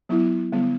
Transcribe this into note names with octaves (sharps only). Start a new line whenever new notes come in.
F#3 B3 E4
D3 G3 B3